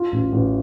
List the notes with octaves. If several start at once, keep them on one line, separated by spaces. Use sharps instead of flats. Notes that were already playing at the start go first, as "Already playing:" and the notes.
Already playing: F4
A1
A1